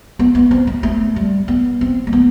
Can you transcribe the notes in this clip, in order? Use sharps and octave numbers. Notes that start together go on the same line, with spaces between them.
B3
B3
C4
B3
A3
G3
B3
C4
A3
B3